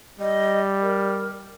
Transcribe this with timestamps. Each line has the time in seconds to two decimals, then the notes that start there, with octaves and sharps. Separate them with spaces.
0.20 G3 D#5
0.82 A#4